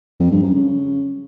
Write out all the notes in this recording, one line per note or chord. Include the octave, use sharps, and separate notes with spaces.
F2
G2
F#2
C#3